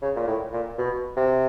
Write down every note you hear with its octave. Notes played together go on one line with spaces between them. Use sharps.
C#3
A#2
A2
A#2
B2
C3